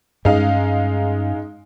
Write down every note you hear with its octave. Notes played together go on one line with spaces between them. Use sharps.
G2 G#3 C#4 D#4 F5